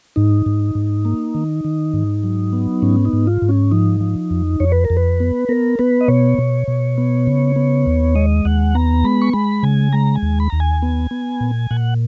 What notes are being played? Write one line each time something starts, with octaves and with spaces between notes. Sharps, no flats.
G#2 D#4
G#2
G#2
A#3
D#3
D#3
G#2
F#3
B3
G#2 C#4
D#4
G#2
F4
G#2
C#4
F3 D#4
F3
F2
F2 C#5
B4
A#4
F2
B4
B3
B3 A#4
B3 B4
D#5
B2 C#5
B2
B2
B3
C#3
B3
D#2
G#3 D#5
D#2 F#5
B3 A#5
G#3 B5
C#6
G#3 B5
C#3 G#5
G#3 A#5
G#5
D#2
B5
D#2 A#5
G#5
B3
B3
A#2
A#2 F#5